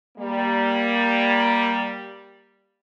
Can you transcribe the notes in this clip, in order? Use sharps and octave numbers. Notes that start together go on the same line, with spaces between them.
G3 A#3